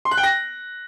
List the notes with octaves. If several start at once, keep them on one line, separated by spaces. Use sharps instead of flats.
C6
F#6
G5
A#6